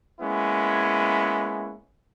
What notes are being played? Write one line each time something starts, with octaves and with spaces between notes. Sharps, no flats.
G#3 A#3 B3 C#4 E4